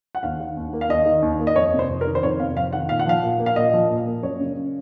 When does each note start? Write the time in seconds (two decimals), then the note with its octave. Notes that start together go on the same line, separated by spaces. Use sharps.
0.15 F#5
0.23 D#2 F5
0.40 D#3
0.57 D#2
0.73 A#3
0.81 F5
0.89 D#2 D#5
1.06 D#3
1.22 D#2
1.40 A#3
1.47 D#5
1.56 F2 C#5
1.74 C3
1.79 C5
1.89 F2
2.01 A#4
2.07 D#3
2.15 C5
2.23 F2 C#5
2.40 C3 F5
2.57 F2 F5
2.73 D#3 F#5
2.89 A#2 F5
3.00 F#5
3.07 F3 F5
3.23 A#2
3.39 A#3
3.46 F5
3.56 A#2 D#5
3.73 F3
3.90 A#2
4.06 A#3
4.23 F#2 C#5
4.40 C#3